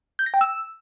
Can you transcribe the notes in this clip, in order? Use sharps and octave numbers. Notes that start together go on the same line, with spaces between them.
G6
A#6
G5
E6